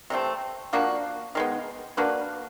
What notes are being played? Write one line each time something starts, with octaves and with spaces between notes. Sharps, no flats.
C3 E3 A3 C4
F3 A#3 D4 F#4
D#3 G#3 B3
A#3 D4 F#4 B4